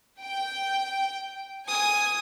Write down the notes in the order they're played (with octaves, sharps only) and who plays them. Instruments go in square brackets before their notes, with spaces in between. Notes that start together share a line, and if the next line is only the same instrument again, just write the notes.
[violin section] G5
[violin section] G#5 [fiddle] D#6